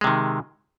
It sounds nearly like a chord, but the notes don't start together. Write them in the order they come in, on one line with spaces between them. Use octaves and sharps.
G#3 C3 D#3